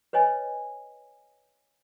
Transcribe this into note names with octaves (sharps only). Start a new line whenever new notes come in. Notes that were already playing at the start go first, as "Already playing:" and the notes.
B4 C#5 D#5 G#5